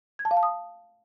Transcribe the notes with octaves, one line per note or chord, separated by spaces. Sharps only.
G#6
A5
F5
A5
D#6